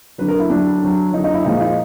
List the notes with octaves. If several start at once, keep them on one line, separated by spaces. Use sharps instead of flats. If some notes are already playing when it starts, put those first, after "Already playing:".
D3 F#3 B4
A#4
E4
D3 F#3 D4
D3 F#3
D3 F#3 D#4
D#4
E4
A#2 F3 G#3 D#4
D#4